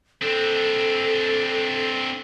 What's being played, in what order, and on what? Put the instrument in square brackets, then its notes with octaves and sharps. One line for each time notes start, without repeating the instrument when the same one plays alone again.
[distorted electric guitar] C4 D4 [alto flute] A4